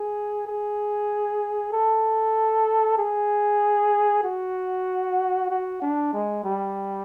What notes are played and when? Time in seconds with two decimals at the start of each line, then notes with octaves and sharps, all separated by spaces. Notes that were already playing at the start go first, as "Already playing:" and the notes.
Already playing: G#4
0.47 G#4
1.73 A4
2.98 G#4
4.24 F#4
5.50 F#4
5.82 D4
6.13 G#3
6.44 G3